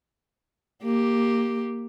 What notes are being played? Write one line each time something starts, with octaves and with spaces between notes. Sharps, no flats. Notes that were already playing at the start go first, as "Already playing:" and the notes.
A#3 G4